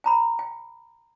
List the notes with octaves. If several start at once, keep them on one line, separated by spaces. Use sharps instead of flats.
G5 A#5 B5
G5